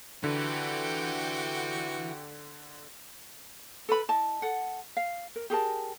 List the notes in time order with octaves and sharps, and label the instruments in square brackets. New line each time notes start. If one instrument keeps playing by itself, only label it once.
[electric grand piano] D3 [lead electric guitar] E4 B4 [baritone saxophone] F#4 [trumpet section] G4 F#5 G5
[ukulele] A4 B4 B5
E4 D#5 A5
A4 F#5
F5
A#4
G4 G#4 A#4 A5